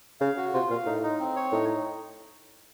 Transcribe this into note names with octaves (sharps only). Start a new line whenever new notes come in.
C#3 F5
F#4
C3 F4
A#2 F5
A2 D#4
D#4
C4
C#5
A2 D#4